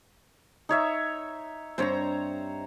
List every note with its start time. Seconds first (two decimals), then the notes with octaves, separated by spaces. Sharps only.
0.69 D#4 C#5 E5
1.78 G2 G3 C4 C5 C#5 A#5